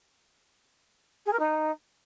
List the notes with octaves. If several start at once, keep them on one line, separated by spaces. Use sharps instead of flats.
G#4
A#4
D#4